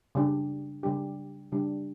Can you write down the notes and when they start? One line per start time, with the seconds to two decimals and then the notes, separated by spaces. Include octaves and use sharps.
0.15 C#3 G3 D4 G4
0.83 C#3 G3 D4 G4
1.52 C#3 G3 D4 G4